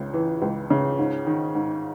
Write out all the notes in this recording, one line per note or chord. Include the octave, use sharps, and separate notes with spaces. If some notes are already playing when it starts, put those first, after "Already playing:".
Already playing: C#2 C#3
E3
C#2
C#3
G#2
D#3
G#2